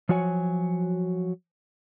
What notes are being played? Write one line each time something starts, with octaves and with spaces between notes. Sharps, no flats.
F3 F#3 F#4 C#5 G#5